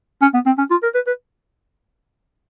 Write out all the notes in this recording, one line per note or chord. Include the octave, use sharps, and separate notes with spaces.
C#4
B3
C4
C#4
F4
A#4
B4
B4